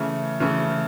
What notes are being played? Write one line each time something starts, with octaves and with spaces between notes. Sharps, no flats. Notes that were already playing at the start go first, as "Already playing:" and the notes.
Already playing: C#3 E3 A3
C#3 E3 A3